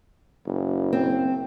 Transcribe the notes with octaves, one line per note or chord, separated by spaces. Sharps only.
F#1
C4